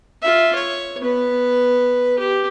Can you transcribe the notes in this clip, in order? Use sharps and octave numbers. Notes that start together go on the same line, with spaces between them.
F4 E5
C#5
B3 B4
G4